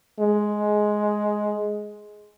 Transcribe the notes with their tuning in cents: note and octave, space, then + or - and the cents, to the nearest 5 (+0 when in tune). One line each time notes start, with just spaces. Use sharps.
G#3 +10